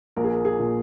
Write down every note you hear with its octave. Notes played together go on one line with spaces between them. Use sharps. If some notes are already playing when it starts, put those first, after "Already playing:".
A#1 A#4
G#4
A#4
G#4
A#2